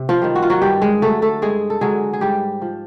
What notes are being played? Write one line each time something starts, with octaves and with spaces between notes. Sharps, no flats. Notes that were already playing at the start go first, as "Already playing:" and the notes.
Already playing: C3
F3 F4
D#3 G3
F#4
F4
F#3 F#4
G2 G3 G4
G#3 G#4
D3 F#3 A3 A4
A3 A4
G2 G#3 G#4
A4
D3 F#3 G#3 G#4
G#4
G#2 G3 G4
F3